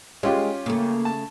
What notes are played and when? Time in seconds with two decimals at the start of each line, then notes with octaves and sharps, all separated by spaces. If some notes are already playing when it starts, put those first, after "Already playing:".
0.23 G#3 C#4 F4 G4
0.66 C#3 A3 A#3
1.05 A5